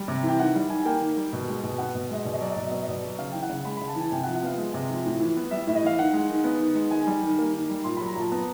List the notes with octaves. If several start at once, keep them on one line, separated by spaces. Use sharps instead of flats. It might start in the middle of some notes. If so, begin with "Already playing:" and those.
Already playing: G3
C3
E3
G5
D#3 F#5
G3
D#3 G#5
A#3 G5
D#3
G3
B2
G#3
B2
B3 F#5
B2
G#3 D#5
B2 D5
D#5
F#3 D5
D#5
B2 D5
D#5
B3 D5
D#5
B2 D5
F#3
C#3 F5
E3 G5
F#5
C#3
G#3 B5
C#3 B5
A5
E3 G#5
C3 G5
F#5
F3
F#5
B3 F5
G#3
C3
F3
A2
E3
B3
G3 E5
A2 E5
D#5
E3 F5
D#3 F#5
G#3
D#3
B3
D#3
G#3
D#3 G#5
G3
D#3
A#3
D#3
G3
A#2 C6
F#3 B5
A#5
A#2 A5
B3 A#5